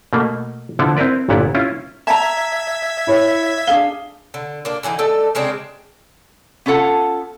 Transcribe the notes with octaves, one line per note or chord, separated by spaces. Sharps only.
B2 A3 A#3
D3 F3 B3 E4 A4
C4 E4 A#4 B4 D5
G1 A#2 B3 E4 D5 F#5
C#4 E4 F4
E5 A5 A#5 G#6 B6
E4 C#5
D4 G#4 F5 G7
D3
A#3 D4
D3 E3 A3 D#4
A3 A4 D5 D#5
C#3 G#3 C4 D4
B3 C#4 F4 A4 F#5 A5